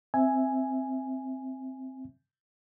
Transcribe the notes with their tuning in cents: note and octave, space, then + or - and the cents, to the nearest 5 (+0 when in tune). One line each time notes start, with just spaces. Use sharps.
C4 +0 E5 +0 G#5 +0